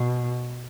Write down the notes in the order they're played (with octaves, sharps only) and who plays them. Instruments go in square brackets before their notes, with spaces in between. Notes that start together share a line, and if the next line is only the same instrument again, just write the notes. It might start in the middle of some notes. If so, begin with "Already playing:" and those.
Already playing: [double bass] B2